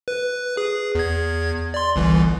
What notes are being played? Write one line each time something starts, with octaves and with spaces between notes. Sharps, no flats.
B4
G#4
E2 G#6
D5 C6
G1 C2 E3